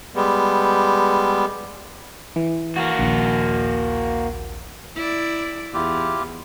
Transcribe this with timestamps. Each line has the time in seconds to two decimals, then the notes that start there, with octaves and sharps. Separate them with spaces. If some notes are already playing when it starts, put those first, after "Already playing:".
0.15 G3 G#3 B3
2.36 E3
2.76 A#3 F#4
2.99 A#1 D#2
4.95 E4 D5
5.74 E2 E4 F4 G4